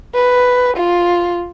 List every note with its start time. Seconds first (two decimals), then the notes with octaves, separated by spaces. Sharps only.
0.15 B4
0.77 F4